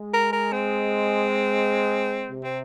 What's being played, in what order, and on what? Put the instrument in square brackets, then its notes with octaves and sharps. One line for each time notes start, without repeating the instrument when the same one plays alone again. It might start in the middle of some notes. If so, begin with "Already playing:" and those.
Already playing: [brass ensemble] G#3
[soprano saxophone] A#4
A#4
C4
[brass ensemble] C3
[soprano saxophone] C4